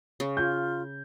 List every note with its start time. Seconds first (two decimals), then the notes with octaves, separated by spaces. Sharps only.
0.20 C#3
0.37 F4 G6